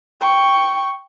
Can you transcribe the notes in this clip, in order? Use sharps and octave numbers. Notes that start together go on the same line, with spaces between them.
G5 C#6